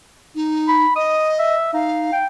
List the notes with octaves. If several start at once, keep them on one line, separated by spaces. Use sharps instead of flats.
D#4
B5
D#5 D#6
E5
D#4 F5
G5